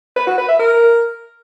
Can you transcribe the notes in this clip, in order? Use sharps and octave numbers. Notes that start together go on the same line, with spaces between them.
B4
F#4
B4
E5
A#4